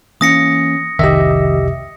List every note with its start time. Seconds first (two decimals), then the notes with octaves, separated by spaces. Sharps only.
0.21 E3 A#3 C#4 D#6 A#6 C#7
0.99 F1 C2 D#3 G4 D#5 E5